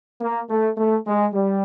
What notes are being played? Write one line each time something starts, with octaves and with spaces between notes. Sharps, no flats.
A#3
A3
A3
G#3
G3